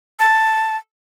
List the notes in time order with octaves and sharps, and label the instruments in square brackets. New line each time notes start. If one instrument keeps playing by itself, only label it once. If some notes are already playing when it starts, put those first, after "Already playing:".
[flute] A5